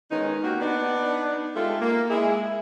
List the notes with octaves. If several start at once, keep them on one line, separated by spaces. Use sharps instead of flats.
D#3 G#3 B3 C#4 D#4
A#3 F#4 G4
B3 D4 D#4
G#3 A3 F4 G4 A4 E5
A#3
G#3 E4 G#4